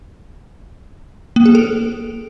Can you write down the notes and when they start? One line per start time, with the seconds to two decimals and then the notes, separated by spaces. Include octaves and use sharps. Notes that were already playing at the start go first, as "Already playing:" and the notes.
1.36 A#3
1.46 G#4
1.55 A4